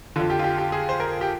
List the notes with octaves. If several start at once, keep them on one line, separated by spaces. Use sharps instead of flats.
F2 D3 F4
G4
F4
G4
G4
G#4
C5
A#4
G4